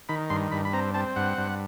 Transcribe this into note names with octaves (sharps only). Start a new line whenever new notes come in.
D#3 B5
G2 C6
G2 B5
B5
C4 A#5
C4 A5
G2 F#5
G2